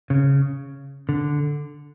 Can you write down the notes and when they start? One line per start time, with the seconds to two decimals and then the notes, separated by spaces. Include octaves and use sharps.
0.10 C#3
1.09 D3